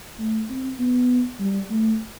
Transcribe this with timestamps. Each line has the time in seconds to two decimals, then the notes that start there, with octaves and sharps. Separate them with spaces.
0.19 A3
0.50 C4
0.79 B3
1.40 G3
1.71 A3